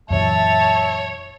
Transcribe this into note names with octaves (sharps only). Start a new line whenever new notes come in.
F#2 A#2 E3 C#5 E5 A5